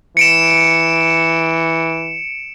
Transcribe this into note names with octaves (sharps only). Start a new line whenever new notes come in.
E3 C#7 D7 E7